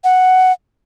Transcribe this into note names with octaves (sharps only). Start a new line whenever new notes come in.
F#5